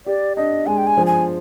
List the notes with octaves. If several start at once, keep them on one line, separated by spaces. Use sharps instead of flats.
G4 D5
D4 D#5
G#3 G#5
G5
G#5
F3
G#5